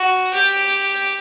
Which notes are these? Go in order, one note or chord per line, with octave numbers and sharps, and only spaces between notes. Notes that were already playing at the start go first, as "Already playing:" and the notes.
Already playing: F#4
G4